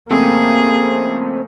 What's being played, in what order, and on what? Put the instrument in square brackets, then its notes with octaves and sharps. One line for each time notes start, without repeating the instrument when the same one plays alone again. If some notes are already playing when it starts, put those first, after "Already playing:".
[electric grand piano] F2 C#3 A3 [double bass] A#3 [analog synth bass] C4 [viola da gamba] G#4